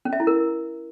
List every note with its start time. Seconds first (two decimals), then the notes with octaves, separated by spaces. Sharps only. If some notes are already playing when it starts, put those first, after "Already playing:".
0.05 C#4
0.13 E5
0.20 E4
0.27 A#4